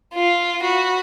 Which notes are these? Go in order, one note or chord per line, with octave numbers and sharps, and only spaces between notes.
F4
F#4 B5